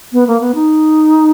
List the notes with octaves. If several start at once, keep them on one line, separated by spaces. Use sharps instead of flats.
B3
A#3
B3
D#4